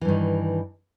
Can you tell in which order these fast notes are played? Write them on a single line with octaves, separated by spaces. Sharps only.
E3 G2 D#3